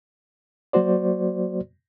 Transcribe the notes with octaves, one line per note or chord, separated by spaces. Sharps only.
F#3 A#3 F#4 C5 D5